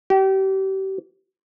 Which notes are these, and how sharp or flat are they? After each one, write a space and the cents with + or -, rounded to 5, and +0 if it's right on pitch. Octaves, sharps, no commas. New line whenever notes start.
G4 -35